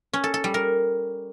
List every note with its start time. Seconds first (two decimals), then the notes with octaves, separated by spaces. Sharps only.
0.13 C#4
0.24 A4
0.34 A4
0.44 G3
0.54 A#4